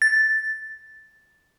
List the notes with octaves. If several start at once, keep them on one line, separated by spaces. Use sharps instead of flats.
A6